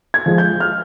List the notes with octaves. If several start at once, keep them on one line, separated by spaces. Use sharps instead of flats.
G#6
F3 G#3
G6
F6